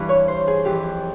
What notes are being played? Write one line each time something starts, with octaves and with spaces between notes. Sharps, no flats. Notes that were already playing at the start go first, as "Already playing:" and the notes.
Already playing: G2 E3
C#5
C5
G#4
F2 E3 G4